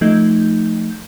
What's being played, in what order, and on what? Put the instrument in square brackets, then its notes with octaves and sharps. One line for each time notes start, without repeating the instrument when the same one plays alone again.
[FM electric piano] F3 A3 D#4 G6